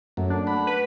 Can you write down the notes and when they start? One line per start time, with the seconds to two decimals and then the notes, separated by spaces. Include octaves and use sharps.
0.17 F#2 F#3 A3 A#3
0.30 D4
0.47 A3 F#5 B5
0.67 B4